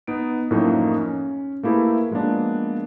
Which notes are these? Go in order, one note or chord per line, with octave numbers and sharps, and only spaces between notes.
B3 D#4 D7
F#2 A2 F3 A3 A#3 D#4
C#4
A3 A#3 E4 G4 G#4 B4
F3 G#3 A#3 B3 D4